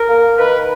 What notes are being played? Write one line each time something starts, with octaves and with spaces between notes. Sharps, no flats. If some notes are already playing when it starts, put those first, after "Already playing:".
Already playing: A#4
A#3
A#3
D#3 B4